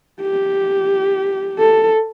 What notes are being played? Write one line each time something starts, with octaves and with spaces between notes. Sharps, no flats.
G4
A4